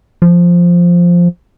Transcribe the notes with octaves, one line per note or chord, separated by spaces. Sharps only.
F3